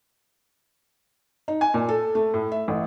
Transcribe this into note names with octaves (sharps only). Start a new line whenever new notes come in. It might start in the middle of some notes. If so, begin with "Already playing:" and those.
D#4
G#5
A#2
A4
A3
A2
E5
A1